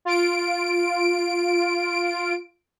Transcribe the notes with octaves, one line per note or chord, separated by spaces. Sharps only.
F4 D7